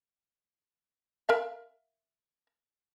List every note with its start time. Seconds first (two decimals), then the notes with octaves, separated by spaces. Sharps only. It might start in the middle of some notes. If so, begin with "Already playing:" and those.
1.29 A#4 E5 F5